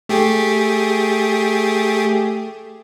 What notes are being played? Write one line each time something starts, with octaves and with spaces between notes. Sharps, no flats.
A3 G4 G#4